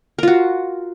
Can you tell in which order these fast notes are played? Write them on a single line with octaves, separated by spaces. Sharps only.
A#4 F4 F#4